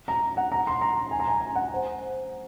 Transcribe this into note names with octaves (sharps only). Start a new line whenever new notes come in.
A#5
F#5
A#5
C6
A#5
G#5
A#5
G#5
A#5
F#5
C5